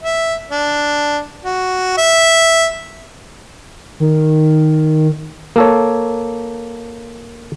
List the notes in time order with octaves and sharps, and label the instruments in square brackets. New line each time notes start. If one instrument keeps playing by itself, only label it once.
[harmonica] E5
D4
F#4
E5
[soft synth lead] D#3
[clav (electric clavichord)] A#3 A4 C#5